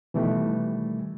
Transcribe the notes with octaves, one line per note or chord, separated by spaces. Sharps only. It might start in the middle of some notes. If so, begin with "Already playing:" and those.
B2 D#3 E3 G3 A3